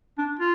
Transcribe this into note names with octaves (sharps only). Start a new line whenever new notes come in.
D4
F4